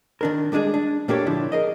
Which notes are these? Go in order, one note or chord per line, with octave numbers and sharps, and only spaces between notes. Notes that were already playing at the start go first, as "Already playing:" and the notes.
D#3 D4 A#4
G3 G#3 D4 F4 G#4
D4
A#2 A#3 D4 G4 A4 C#5
D3 F3 D4 E4
G#4 A#4 D#5